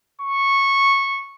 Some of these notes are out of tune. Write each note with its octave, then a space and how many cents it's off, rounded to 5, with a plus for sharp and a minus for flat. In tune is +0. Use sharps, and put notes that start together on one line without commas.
C#6 -10